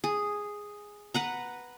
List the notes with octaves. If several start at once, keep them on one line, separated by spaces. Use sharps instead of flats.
G#4
B4 F#5 A#5